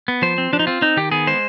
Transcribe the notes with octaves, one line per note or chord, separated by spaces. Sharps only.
B3
F3 C5
C4
F3 D4
D#4
C4 F4
C4 D#4
D#3 G4
B3 G#4
G#3 C5